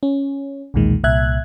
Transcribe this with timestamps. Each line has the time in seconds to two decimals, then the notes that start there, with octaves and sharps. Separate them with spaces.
0.03 C#4
0.74 B1 E2 A#2 D#3 G#3
1.04 C2 A#2 E5 F#6 G#6